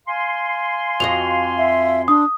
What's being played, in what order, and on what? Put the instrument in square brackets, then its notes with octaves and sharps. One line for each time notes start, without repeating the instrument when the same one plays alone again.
[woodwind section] F5 G#5 C6
[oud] F2 F#4 D#5 [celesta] F7
[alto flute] E5
[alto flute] D4 [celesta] D#6